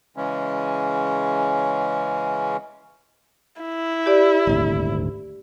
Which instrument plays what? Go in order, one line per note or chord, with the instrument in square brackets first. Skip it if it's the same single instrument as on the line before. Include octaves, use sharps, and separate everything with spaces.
[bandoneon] C#3 E3 G#3 C#4
[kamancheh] E4
[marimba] G4 D5
[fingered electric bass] D#1 G#1 D2